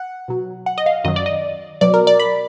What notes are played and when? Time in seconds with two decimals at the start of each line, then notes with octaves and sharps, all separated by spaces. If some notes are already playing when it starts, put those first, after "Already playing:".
Already playing: F#5
0.28 B2 F#3
0.66 F#5
0.78 D#5
0.86 F5
1.04 F#2 D#3 F#3 D#5
1.16 D5
1.26 D#5
1.81 B2 F#3 D5
1.94 A#4
2.07 D5
2.20 B5